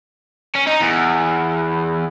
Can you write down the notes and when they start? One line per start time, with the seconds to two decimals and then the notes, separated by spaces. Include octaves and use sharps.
0.56 C#4
0.67 D#4
0.81 E2